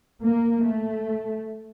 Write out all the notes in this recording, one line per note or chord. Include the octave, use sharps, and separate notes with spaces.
A#3
A3